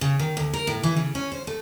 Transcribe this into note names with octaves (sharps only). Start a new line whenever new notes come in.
C#3
D#3
D2
A#4
A2
E3
C#3
C#4
C5
A3